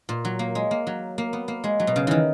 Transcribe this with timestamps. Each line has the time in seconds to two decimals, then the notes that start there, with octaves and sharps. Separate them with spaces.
0.09 A#2
0.25 F#3
0.39 A#3
0.55 G#3
0.71 A#3
0.87 F#3
1.18 A#3
1.33 B3
1.48 A#3
1.64 G#3
1.80 F#3
1.87 B2
1.96 C#3
2.07 D#3 E3